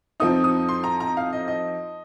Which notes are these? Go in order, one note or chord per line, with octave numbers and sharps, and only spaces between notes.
F2 F3 C4 D#4 D#6
D#6
C6
A#5
A#5
F5
D#5
D#5